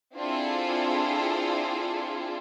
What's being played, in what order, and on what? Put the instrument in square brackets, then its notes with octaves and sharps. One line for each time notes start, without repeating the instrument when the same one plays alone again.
[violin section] C4 D4 E4 F4 G#4 A4